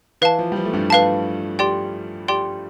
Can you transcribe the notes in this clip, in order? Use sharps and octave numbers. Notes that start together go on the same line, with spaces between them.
E3 B4 F5 A5
F3
G3
F3
A3
G2 G3
B4 F5 A5
G4 D5 G5 C6
G4 D5 G5 C6